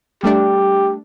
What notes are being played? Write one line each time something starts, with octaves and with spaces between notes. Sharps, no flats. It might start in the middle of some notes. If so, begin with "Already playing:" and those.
G3 A3 D4 G4